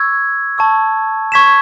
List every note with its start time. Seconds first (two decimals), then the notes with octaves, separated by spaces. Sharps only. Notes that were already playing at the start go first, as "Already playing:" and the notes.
Already playing: C#6 E6 G#6
0.58 A5 C#6 E6
1.32 C#6 G#6 B6 E7